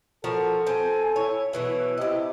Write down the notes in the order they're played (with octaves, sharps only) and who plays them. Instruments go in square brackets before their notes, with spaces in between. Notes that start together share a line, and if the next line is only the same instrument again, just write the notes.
[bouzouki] F3 F#4 A#4 [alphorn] A4
[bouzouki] C4 [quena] G#5
[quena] E4 [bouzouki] C#5
[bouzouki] B2 E3 F#3 [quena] E4
[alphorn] C3 [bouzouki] G4 D#5